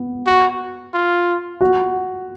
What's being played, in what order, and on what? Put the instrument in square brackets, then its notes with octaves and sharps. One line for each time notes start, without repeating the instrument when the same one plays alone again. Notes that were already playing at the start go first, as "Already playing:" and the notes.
Already playing: [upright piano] B3
[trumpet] F#4
F4
[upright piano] F#4